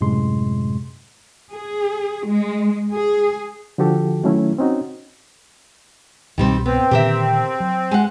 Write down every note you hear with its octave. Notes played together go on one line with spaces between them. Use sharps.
F#2 A2 C3 G#3 C6
G#4
G#3
G#4
D3 F3 F#4 G4 A4
D#3 F#3 A3 C#4 E4
C4 C#4 D#4 F#4
C2 G#2 B2 D#3 G3 C4
B3 C4
A#2 D3 D#3 G4 A#4 E5
F#3
G#3 F#5